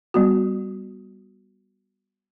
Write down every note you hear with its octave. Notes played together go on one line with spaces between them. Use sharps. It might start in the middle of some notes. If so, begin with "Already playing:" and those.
G3 B3 F#4